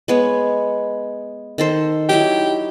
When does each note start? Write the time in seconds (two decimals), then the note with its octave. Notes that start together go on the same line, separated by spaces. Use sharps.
0.08 G#3 B3 C#5
1.58 D#3 A4 C5
2.09 F#3 D#4 E4 G4